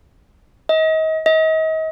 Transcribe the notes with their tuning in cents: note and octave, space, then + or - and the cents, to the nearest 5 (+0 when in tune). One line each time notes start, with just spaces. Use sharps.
D#5 +35
D#5 +40